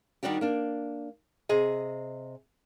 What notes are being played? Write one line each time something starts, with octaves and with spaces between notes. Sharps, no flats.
D#3 G3 D4 F#4 G4
A#3 D4
C3 G#4 D#5